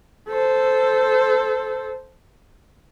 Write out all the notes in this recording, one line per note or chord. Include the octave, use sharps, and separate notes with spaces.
A4 C5